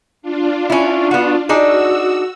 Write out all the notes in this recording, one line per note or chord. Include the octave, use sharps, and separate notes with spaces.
D4 F4
C#4 E4
B3 F#4
D4 D#4 F#4 G#4 E6